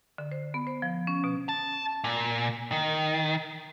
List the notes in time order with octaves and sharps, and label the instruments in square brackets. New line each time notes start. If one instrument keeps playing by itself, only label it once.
[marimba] D3
C5
B3
C5
F3
C#4
B2
[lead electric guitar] A5
A#2
D#3